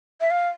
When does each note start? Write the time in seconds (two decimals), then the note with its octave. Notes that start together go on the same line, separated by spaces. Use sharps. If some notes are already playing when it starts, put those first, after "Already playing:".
0.21 E5
0.31 F5